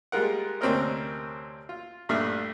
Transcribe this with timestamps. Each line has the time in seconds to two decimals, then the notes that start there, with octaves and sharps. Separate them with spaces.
0.12 G3 G#3 F4 A#4 F#5
0.61 D2 C3 C4 C#4 A#4 D#5
1.69 F4
2.09 A#1 G2 A3 E5 D#6 F6